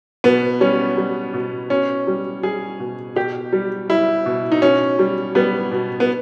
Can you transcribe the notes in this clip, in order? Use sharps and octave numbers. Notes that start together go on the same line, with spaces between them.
B2 B3
G3 C#4
G3
B2
B2 C#4
G3
G3 G#4
B2
B2 G4
G3
G3 E4
B2
D#4
B2 C#4
G3
G3 B3
B2
B3